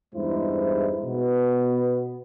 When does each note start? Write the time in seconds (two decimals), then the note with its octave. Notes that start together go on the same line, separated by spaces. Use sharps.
0.15 E2 G2 G#3 D#4 E4 C5
1.05 B2 B3